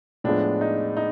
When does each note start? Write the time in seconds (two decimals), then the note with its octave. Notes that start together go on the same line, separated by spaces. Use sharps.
0.24 A2 F3 G#3 B3 D4
0.61 D#4
0.97 D#4